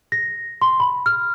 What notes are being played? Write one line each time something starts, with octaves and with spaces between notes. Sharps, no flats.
A#6
C6
B5
F6